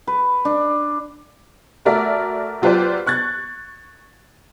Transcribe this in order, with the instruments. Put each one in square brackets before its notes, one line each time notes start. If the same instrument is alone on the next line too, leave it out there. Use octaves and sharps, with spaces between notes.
[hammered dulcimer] B4
D4
[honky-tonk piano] A3 F#4 A#4 D5 E5
F#3 F4 G4 B4 C5 D5
C#6 F#6 G#6 A6